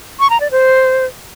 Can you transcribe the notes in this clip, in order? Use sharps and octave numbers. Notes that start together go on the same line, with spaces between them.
C#6
A#5
D5
C5